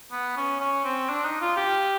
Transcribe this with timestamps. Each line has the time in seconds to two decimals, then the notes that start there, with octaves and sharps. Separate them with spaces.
0.12 B3
0.37 C#4
0.60 C#4
0.85 C4
1.09 D4
1.25 D#4
1.41 F4
1.57 G4